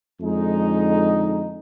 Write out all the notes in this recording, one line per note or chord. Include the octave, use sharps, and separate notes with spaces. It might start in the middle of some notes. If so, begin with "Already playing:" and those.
F2 D3 G#3 D#4